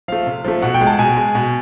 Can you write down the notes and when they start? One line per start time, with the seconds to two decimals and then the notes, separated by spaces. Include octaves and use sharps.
0.08 F3 A3 F5
0.26 C3
0.45 F3 A3
0.62 B2 F#5
0.74 G5
0.81 G#3
0.87 A5
0.98 B2 G#5
1.17 G#3
1.35 B2